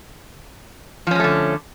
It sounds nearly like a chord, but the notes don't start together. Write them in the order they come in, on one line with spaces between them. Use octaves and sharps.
F3 C#4 G#3 A3 D3